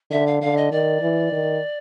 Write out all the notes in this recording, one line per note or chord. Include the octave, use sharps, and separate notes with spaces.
D3 E5
F5
D3 F5
D#5
D#3 D5
E3
D#3